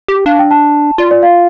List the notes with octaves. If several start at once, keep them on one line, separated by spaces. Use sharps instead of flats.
G4
D4 F5
G5
A5
F4 D5
D5
F5